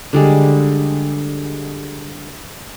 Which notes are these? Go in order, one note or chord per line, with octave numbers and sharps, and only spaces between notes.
D3 G3 G#3